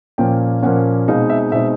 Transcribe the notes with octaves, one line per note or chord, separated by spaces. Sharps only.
A#2 F3 A#3 C#4 G5
A#2 F3 A#3 C#4 F#5
B2 G#3 C4 D#4 F5
E5
B2 G#3 C4 D#4 E5